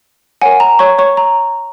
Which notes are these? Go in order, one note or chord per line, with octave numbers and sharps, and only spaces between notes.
A#4 C#5 F#5 G#5
A#5
C#5 C#6
C#5 C#6
A#5